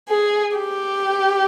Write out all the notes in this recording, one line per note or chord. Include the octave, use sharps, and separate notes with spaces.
G#4
G4